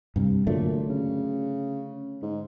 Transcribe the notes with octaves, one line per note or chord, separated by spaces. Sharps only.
G2 C3
A#2 D3 F#3 A3
C#3
G#2